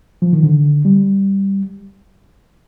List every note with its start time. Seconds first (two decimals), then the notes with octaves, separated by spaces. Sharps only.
0.22 F3
0.33 D#3
0.43 D3
0.85 G3